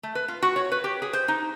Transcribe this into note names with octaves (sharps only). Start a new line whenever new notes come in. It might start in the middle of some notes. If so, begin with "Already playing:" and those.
A3
B4
F4
F#4
C#5
B4
G4
G#4
C5
D#4